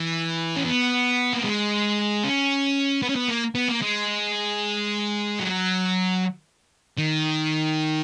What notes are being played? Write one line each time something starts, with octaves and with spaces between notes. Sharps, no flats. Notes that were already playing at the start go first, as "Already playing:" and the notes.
Already playing: E3
C#4
B3
A#3
G#3
C#4
B3
C#4
B3
A#3
B3
A#3
G#3
F#3
D#3